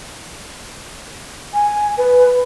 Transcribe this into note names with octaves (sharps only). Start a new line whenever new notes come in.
G#5
B4